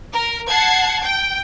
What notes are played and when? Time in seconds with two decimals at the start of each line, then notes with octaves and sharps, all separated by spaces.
0.12 A#4
0.48 F#5 A5 G#6 C7
1.04 G5